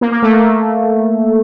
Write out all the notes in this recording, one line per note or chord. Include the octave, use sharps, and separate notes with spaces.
A#3
A#3
A3
A#3